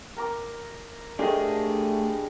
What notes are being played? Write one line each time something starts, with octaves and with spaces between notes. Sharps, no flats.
A#4 A#5 D6
A3 D4 G4 G#4 D#5